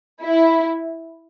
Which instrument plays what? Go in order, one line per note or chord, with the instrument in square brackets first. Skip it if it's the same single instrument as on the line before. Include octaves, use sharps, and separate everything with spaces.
[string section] E4